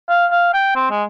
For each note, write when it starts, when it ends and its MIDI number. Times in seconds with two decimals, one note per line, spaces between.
0.09 0.27 77
0.31 0.52 77
0.54 0.73 79
0.76 0.90 60
0.91 1.04 56